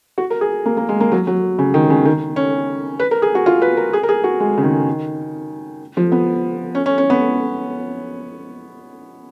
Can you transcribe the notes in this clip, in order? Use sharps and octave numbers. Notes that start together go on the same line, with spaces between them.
F#4
A#4
G#4
A#3
A#3
G#3
A#3
F#3
F#3
C#3
D#3
C#3
D#3
C#4
B4
A#4
G#4
F#4
F4
B4
A#4
G#4
A#4
G#4
F#4
G#3
C#3
D#3
F3
B3
C#4
C#4
C#4
B3